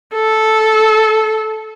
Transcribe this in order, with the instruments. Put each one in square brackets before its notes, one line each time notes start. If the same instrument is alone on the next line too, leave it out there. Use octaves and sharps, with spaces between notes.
[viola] A4